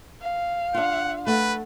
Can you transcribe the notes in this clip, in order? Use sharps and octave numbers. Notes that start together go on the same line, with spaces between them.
F5
D4 F4 F#5
A3 B4 F#5